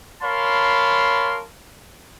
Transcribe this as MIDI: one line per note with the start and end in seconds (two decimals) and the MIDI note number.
0.22 1.40 70
0.22 1.40 73
0.22 1.40 77
0.22 1.40 81
0.22 1.40 83
0.22 1.40 84